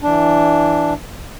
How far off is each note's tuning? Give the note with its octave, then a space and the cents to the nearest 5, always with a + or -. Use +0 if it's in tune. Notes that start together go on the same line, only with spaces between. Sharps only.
E3 +0 D4 +0